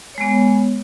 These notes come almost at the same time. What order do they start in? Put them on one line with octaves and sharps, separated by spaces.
C#5 G#3 B3